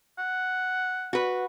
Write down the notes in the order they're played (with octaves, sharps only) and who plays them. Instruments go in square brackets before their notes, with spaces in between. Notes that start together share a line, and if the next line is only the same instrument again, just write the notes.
[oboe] F#5
[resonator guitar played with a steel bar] F#4 B4